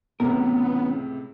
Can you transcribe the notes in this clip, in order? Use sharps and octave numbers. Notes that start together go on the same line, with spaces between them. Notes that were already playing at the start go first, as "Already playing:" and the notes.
C#2 A2 C3 E3 B3 C#4 A#4